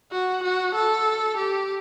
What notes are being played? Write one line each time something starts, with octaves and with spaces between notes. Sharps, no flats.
F#4
F#4
A4
G4